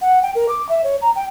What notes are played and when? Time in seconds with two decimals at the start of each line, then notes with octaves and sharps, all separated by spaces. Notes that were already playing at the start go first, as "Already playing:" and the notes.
0.02 F#5
0.22 G5
0.35 A#4
0.49 D6
0.69 E5
0.84 C#5
1.02 A#5
1.16 G5